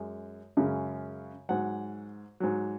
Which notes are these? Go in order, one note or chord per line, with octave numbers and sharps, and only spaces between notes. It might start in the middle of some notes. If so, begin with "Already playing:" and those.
Already playing: F#2 G#3
F#2 C#3 G#3
G#2 F#3 F#5
G#2 F#3